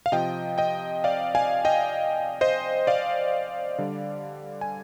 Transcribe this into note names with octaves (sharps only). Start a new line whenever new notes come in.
F5
C3 F3 D#5 G5
D#5 G5
D5 F5
F5 G#5
D#5 G5
C5 D#5
D5 F5
D3 G3
G#5